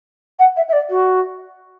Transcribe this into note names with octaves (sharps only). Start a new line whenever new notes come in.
F#5
E5
E5
D5
F#4